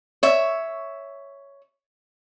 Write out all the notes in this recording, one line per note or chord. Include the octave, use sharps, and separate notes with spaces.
C#5 E5